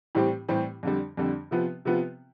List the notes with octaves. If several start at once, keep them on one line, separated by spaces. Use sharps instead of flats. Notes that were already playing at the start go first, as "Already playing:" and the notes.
A2 E3 G3 C4 G4
A2 E3 G3 C4 G4
F2 D3 G3
F2 D3 G3
C3 F3 B3 F4
C3 F3 B3 F4